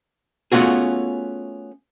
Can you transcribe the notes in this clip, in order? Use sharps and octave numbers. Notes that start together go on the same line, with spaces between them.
A3 B3 C#4 F4 F#4 G#4